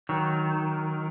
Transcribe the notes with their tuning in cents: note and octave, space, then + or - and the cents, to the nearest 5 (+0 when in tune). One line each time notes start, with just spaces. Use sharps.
D#3 +0 F#3 +0